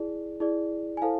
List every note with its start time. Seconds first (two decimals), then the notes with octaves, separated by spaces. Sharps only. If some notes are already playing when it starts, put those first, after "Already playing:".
Already playing: E4 G#4 D5
0.40 E4 G#4 D5
0.97 G#5
1.02 E4 A4 C5 F5 A5